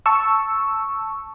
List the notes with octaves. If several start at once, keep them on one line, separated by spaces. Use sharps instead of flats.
A5 C#6 E6